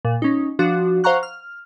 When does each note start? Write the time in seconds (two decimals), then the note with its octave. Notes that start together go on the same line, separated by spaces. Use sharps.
0.05 A#2
0.22 C#4 D#4
0.59 F3 D4 F#4
1.04 C5 F5 F#5 A#5 C#6 F#6
1.23 F6